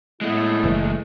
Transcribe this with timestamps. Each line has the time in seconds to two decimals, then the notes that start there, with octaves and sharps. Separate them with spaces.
0.21 A2 G#3 A3 B3 E4
0.64 F#1 E3